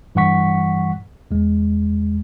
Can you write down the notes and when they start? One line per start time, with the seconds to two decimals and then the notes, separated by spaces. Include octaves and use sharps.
0.15 G2 E3 G3 F#5 C#6 B6
1.31 E2 G#3